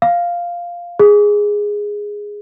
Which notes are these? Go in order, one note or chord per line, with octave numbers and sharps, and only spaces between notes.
F5
G#4